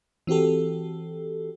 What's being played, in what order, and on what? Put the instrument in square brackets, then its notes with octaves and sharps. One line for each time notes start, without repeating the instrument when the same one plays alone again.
[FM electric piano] E3 C4 F#4 G4 A4